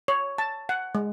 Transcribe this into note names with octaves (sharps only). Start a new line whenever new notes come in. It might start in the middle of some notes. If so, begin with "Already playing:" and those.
C#5
A5
F#5
G#3